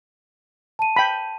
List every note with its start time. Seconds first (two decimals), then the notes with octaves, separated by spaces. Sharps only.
0.79 A5 D#7
0.96 G5 B5